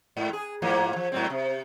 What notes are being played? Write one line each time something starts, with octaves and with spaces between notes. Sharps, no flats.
G#2
G#4
G#2 F3 A#3
F3
G#2 F#3 C4
C3